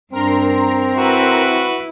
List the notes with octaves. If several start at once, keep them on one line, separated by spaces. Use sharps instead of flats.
G2 C4 D4 A#4 A#5 C6
E4 F#4 B4